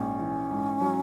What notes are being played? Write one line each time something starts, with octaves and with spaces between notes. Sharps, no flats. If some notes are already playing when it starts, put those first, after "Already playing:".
Already playing: A#1 G#2 C#4
E3
G#2
F#3